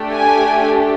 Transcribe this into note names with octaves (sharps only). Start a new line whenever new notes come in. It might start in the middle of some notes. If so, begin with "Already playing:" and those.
Already playing: A3 D4 G4
G#5